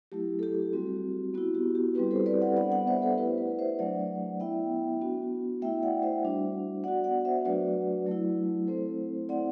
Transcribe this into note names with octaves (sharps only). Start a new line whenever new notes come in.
F#3 A3 E4 G4
A4
G4
G3 C4 F#4
B3 E4 F#4
G4
G4
G3 C4 E4 G4 B4
A4 C5
B4 D5
D5 F#5
G3 B3 D4 D5 F#5
D5 F#5
C5 E5
A4 C5
A3 E4 G4 B4
B4 D5
C5 E5
F#3 A3 D4 D5 F#5
B3 E4 E5 G5
B3 D4 F#4
A3 E4 E5 G5
D5 F#5
C5 E5
G3 D4 F#4
B3 F#4 D5 F#5
D5 F#5
C5 E5
F#3 A3 D4 F#4 B4 D5
F#3 A3 E4
A3 C4 E4 A4 C5
A3 C4 E4 D5 F#5